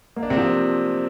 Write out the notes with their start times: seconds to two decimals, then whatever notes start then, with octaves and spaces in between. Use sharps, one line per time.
0.16 A#3
0.23 D4
0.30 C3 C4
0.37 F3